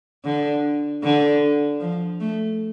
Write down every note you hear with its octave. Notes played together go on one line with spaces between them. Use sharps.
D3
D3
F3
A3